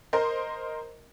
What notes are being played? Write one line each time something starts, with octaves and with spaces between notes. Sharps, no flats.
A#4 C5 D#5